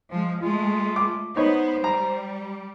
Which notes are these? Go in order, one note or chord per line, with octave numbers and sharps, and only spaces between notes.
F3 G#3
G#3 A3 F4
D6
B3 D#4 C5 C#5
G3 A#5